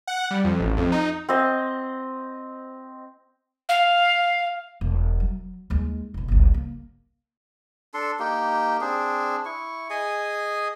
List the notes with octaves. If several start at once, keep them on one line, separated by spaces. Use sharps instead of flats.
F#5
G3
F2
A1
F2
D#4
C4 D#5
F5
E1
F#3
D#2 G#3
F1 B2
G1 C#2
A#3
D4 A4 C6
A#3 D#4 G4
C4 D4 G#4
E4 C#6
G#4 D#5 G#5